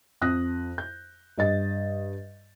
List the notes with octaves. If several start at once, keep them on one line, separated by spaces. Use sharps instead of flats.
F2 D#6 F#6 A#6
G6
G2 D#5 A6